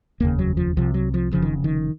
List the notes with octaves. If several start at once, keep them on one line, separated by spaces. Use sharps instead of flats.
F1 D#2 C#3 A#3
F#3
F3
C2 C3 F3
F#3
F3
F1 F2 C#3 F3
D#3
D#3